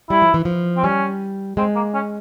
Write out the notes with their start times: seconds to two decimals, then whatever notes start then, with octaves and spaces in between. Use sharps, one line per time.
0.10 G3 E4
0.22 F3
0.34 E3
0.45 F3
0.77 C4
0.84 G3 C#4
1.57 G#3 C4
1.75 A#3
1.94 C#4